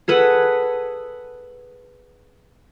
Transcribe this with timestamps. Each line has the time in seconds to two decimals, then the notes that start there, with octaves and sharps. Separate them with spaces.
0.08 G#4 A4 B4 F#5